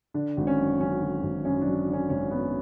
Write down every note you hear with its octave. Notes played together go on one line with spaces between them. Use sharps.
D3 D4
G#1
C#4
F#2
F#3 C#4
D3
G#1
F#2 C#4
D4
F#3
D3 C#4
G#1 C#4
F#2 B3